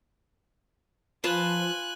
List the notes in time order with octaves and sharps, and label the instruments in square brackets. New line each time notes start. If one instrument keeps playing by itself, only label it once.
[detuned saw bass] F3 [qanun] F4 B4 A5 [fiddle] G#5 F#6